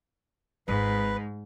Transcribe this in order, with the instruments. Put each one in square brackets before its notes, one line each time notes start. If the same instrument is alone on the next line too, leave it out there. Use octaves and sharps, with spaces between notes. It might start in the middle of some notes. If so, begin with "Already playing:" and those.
[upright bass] G#1 [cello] G#2 [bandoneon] B4